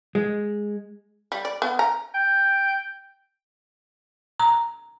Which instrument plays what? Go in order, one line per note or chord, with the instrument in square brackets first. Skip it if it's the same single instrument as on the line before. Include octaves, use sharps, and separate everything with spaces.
[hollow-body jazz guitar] G#3
[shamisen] G3
D5
B3
A#5
[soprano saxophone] G5
[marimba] A#5